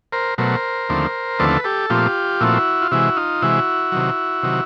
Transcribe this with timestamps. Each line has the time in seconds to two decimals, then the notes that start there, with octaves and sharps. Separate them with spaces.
0.12 A#4 C5
0.38 B2 F#3 A3 A#4 C5
0.89 D#2 D3 F3 A3 C4
1.39 D#2 D3 F3 A3 C4 A4 B4
1.64 G4 A4
1.90 A#2 F3 A3 C4 F4 G4
2.41 A#2 F3 A3 C4 E4 F#4
2.82 F4
2.91 C3 E3 G#3 E4 F#4
3.17 D#4 F4
3.42 C3 E3 G#3 E4 F#4
3.92 C3 D#3 F#3
4.43 C3 D#3 F#3